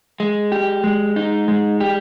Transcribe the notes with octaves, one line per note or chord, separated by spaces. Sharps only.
G#3
G4
G#3
D#4
G#3
G4